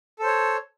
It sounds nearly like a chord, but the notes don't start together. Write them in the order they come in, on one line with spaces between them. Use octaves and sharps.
A4 C5 C#5